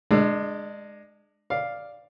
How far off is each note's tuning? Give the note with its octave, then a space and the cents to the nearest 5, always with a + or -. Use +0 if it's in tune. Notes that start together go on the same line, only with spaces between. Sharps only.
G#3 +0 D4 +25 E6 +30
D5 +0 F5 +0